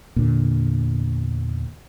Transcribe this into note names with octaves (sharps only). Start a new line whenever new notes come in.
E2 A#2 D3